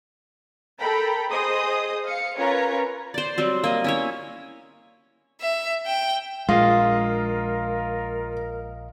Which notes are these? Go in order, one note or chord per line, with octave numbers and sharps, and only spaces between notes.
A4 A#4 G5 A#5 B5
G#4 C5 D#5 D#6
F5 C#7
C#4 F4 A#4 B4 C#5 A#5
C5 D5
F#3 G3 C4
A#3 D#5
C#4 E4 C#5
E5
G5
A#1 G#3 F4 A#4 D#5 F5